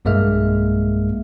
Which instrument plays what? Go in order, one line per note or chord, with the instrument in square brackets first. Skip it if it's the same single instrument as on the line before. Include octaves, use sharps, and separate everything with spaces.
[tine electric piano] B1 G2 G#3 A#3 E5 F6